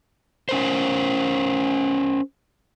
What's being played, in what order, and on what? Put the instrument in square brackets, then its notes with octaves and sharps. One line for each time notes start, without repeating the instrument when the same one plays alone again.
[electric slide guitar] C#4 A#4 C5